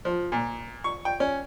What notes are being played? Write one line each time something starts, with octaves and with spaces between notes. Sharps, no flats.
F3
A#2
C#6
G5
C#4